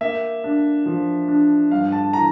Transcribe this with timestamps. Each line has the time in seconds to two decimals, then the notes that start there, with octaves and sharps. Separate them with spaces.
0.01 A#3 E5
0.44 D4
0.86 F3
1.28 D4
1.71 G2 F5
1.92 A5
2.13 E3 A#5